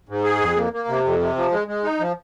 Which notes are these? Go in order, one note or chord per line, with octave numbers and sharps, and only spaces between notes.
G#2
G#4
F2
A#3
A#3
C3
F2
C3
F3
G#3
G#3
D#4
F3